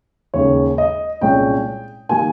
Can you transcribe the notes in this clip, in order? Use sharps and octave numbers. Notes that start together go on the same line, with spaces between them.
D#2 C#3 G#3 C#5
D#5
C2 A#2 G#3 C#4 G5
D#3 G3 A#3 G#5